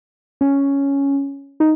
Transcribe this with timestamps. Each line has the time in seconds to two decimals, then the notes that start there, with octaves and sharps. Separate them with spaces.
0.41 C#4
1.60 D#4